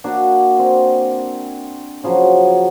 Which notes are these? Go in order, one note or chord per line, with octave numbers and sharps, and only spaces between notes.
A#3 D4 F#4
C4
C#3 F3 F#3